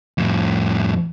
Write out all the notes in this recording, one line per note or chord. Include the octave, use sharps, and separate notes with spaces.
F2 A2